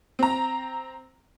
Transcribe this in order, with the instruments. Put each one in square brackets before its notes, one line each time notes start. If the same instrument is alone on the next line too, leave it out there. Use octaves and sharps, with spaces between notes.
[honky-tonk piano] C4 A#5